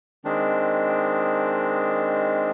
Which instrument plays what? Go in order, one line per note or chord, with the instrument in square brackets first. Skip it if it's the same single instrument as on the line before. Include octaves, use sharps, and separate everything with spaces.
[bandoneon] D#3 G#3 C4 D4